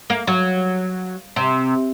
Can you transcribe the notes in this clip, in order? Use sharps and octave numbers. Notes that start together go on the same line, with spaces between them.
A#3
F#3
C3